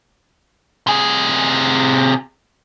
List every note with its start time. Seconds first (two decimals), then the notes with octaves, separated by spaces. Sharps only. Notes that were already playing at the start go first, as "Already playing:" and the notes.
0.87 C3 G#4